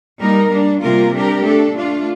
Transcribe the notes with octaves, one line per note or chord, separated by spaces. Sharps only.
G3 A#3 D#4 A#4
G3 A#3 D4
C3 G3 A#3 F4 A#4
G3 D4 G4 A#4
A3 D4 A4
A3 D4 F4